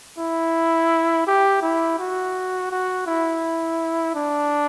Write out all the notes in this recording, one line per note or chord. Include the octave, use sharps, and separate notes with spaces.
E4
G4
E4
F#4
F#4
E4
D4